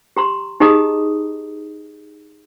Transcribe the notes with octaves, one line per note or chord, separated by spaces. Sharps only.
G4 A#5 C6
D#4 G4 G#4 D#5 A#5 D#6